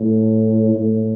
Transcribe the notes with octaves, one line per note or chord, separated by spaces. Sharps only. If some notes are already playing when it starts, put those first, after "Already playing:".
Already playing: A2
A2